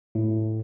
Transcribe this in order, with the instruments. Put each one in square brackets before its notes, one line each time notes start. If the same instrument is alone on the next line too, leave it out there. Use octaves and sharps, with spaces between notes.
[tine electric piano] A2